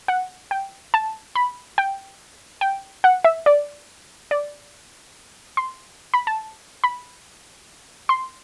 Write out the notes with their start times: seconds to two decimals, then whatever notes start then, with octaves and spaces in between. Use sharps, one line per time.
0.08 F#5
0.51 G5
0.94 A5
1.35 B5
1.78 G5
2.61 G5
3.04 F#5
3.24 E5
3.46 D5
4.31 D5
5.57 C6
6.14 B5
6.27 A5
6.84 B5
8.09 C6